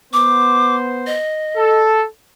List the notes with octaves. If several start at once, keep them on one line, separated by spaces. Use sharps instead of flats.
B3 C5 D6
D#5
A4